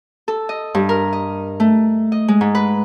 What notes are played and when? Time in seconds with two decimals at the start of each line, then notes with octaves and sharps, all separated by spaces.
0.28 A4
0.49 D#5
0.74 G2
0.89 A#4
1.13 D#5
1.60 A3
2.12 D#5
2.28 G#3
2.41 G#2
2.55 B4